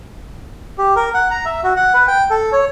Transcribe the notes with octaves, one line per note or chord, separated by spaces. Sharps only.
G4
A#4
F#5
A#5
E5
F#4
F#5
B4
G5
A4
C#5